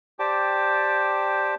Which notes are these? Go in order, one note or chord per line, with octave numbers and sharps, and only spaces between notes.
G4 C5 D5 G5 A5 D6